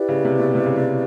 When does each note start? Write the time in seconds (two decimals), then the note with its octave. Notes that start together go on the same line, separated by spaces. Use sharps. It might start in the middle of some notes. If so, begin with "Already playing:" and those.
Already playing: E4 G4 B4 D5
0.08 C#3
0.25 C3
0.39 B2
0.55 C3
0.66 C#3
0.76 C3